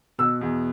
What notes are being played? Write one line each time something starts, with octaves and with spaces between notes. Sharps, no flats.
B2 E6
E2